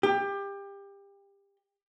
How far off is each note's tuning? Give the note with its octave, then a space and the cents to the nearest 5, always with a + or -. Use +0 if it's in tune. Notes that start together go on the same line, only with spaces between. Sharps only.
G4 +25